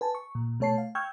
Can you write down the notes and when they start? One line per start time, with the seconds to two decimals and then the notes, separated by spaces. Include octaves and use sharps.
0.01 B4 G#5 A5
0.15 C#6
0.35 A#2
0.60 B2 A3 C#5 A5 C7
0.78 F5
0.95 G5 C#6 E6 F6 G6 G#6